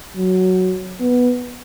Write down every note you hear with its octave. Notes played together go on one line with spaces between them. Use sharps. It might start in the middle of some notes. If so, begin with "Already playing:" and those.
F#3
B3